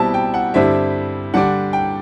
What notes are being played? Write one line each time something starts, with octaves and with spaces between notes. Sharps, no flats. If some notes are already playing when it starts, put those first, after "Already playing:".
Already playing: B2 G3 C4 E4 A5
G5
F#5
G2 D3 G3 C4 E4 E5
D3 G3 D4 F#5
G5